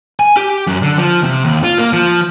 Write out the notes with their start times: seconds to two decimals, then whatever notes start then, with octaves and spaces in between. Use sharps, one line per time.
0.20 G#5
0.37 G4
0.67 F#2
0.82 D3
0.98 F3
1.24 C3
1.44 D#2
1.64 F4
1.79 A#3
1.93 F3